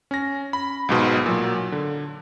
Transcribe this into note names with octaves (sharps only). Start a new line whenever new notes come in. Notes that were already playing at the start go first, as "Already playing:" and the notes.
C#4 A#6
B5
B1 G#2 B2
A#2 F#3
D3